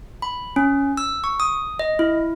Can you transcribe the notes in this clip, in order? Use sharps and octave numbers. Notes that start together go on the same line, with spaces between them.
B5
C#4
E6
C#6
D#6
D#5
E4